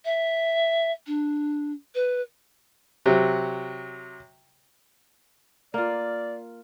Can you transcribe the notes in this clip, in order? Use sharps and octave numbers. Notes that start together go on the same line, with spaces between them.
E5
D4
B4
C3 F#3
A#3 F4 D5